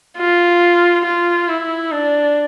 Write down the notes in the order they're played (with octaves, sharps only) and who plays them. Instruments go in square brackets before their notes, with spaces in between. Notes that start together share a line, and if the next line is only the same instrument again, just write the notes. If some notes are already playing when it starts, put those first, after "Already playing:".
[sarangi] F4
F4
E4
D4